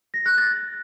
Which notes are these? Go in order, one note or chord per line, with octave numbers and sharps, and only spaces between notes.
A#6
F#6
A6